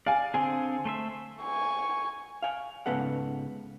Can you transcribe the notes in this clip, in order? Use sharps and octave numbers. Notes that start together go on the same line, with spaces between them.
D5 F5 G#5
D3 C4 G#4 G#5
A3 C5 E5
G#5 C#6
F5 G#5
C#2 G#2 C#3 B3 A4 F#5